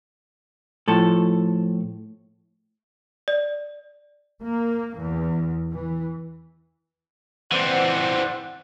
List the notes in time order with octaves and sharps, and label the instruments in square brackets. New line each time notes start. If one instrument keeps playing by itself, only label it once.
[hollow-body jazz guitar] A2 F3 A4
[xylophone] D5
[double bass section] A#3
E2
E3
[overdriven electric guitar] E3 C4 [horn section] C5 D5 F#5